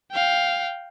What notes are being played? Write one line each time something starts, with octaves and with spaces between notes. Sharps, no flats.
F5 G5